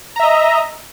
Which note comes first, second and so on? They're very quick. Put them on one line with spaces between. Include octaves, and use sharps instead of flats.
A#5 E5 D#5